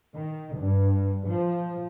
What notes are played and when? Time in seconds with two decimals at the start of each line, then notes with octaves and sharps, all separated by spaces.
0.14 D#3
0.57 G2
1.27 F3